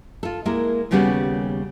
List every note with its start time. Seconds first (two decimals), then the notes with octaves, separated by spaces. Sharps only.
0.23 F4 A4
0.45 G#3 A#3 E4 A#4
0.91 D#2 C#3 G3 B3 C#4 F#4